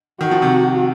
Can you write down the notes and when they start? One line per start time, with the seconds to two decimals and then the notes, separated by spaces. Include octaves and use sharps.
0.21 D#3 F#4
0.31 F3
0.42 C3 D#3